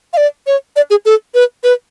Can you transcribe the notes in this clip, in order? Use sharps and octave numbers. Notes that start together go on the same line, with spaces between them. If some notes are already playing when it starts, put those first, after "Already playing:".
F5
D5
C#5
D5
G#4
A4
B4
B4